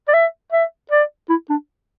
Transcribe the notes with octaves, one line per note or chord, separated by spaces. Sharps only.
D5
E5
E5
D5
E4
D4